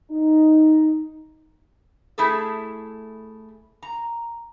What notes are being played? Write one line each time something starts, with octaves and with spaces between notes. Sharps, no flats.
D#4
A3 E4 G#4 A4
A#5